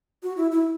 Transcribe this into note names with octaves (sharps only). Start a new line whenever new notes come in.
F#4
E4
E4